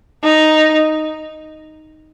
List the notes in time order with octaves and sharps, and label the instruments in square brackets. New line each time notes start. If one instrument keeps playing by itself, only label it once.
[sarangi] D#4